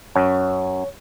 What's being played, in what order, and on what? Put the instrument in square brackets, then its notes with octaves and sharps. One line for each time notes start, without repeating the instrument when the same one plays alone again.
[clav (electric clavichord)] F#2 [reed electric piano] C#5